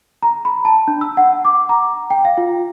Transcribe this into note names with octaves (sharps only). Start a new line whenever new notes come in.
A#5
B5
A5
D4
E6
F#5
D6
A#5
G5
F5
F4